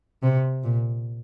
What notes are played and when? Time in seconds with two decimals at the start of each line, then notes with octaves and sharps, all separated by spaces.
0.23 C3
0.63 A#2